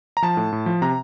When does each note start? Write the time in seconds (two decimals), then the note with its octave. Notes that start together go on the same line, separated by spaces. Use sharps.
0.17 A#5
0.22 F3 A5
0.37 A2
0.52 A2
0.66 F3
0.82 C3 A#5